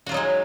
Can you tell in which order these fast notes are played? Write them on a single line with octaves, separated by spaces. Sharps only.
F#4 F4 F#3 D#4 G#3